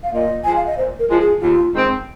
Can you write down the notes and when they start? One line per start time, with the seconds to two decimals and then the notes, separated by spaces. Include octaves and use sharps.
0.03 F5
0.14 A#2 D#5
0.44 F3 G#3 G#5
0.56 F5
0.67 D#5
0.77 A#2 C5
0.99 A#4
1.10 F3 G#3 F4
1.20 G#4
1.42 D#2 F4
1.73 D#3 G#3 C4